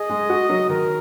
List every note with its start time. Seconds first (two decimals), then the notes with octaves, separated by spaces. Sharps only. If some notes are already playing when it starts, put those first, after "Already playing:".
Already playing: G#4 D#5
0.10 G#3
0.30 F#4
0.50 F#3
0.69 D#3 A#4